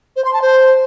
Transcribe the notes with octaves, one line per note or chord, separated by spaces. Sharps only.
C5
C6
A5
C5